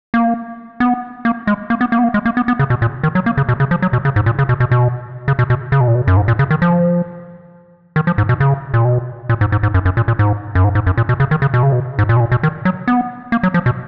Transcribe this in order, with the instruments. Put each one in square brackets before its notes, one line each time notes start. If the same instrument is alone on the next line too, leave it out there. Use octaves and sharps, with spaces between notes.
[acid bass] A#3
B3
A#3
G#3
A#3
B3
A#3
B3
A#3
G#3
A#3
B3
B3
C#3
B2
A#2
D#3
F#3
A#3
C#3
B2
C#3
F3
F#3
B2
C#3
G#2
A#2
C#3
B2
B2
B2
C#3
B2
B2
C#3
B2
A#2
B2
F#2
G#2
A#2
C#3
D#3
F3
D#3
F3
G#2
B2
C#3
A#2
B2
A#2
G#2
G#2
G#2
F#2
F#2
A#2
A#2
G#2
F#2
G#2
G#2
F#2
A#2
B2
C#3
D#3
C#3
B2
C#3
B2
G#2
A#2
B2
A#2
B2
D#3
F#3
B3
A#3
F#3
F3
B2